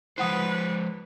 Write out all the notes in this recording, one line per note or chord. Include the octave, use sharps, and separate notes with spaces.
F3 G#3 D#4 B4 C5 F#5 D#6